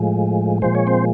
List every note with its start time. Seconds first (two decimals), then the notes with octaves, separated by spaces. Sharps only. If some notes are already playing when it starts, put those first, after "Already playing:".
Already playing: A2 F3 G#3
0.62 A#2 F3 G#3 C5
0.75 C#5
0.87 C4 C5